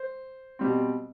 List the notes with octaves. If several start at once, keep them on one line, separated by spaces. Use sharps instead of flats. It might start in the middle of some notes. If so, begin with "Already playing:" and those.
Already playing: C5
B2 G3 C4